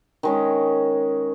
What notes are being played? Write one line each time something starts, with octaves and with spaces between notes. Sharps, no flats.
D#3 G#3 C#4